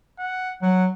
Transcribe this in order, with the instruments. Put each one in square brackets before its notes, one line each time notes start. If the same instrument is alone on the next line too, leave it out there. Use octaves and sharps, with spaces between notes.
[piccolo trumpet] F#5
[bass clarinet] F#3 [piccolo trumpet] F#5